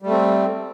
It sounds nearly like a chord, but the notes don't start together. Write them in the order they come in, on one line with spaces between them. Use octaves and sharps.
G3 A3 C4